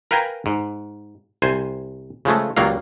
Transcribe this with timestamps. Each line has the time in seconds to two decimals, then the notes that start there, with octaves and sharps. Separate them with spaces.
0.11 A#4 B4 F5 G5 G#5 A#5
0.46 G#2
1.42 C2 C5 G#5
2.25 C#3 F3 G#3 A3
2.57 C#2 F#3 G3 A#3 F5